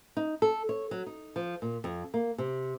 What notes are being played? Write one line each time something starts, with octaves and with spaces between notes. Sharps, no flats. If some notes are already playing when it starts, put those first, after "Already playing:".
D#4
A4
C#5
F#3
D#4
F3
A#2
F2
A#3
C3